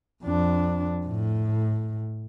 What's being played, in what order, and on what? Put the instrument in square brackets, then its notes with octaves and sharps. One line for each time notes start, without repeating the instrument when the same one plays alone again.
[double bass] F2 D4
A2